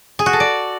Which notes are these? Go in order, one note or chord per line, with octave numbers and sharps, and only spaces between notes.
G#4
F#4
A4
D5